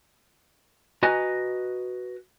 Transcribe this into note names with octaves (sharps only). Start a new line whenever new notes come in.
F#4 B4 D#5 G#5 A#5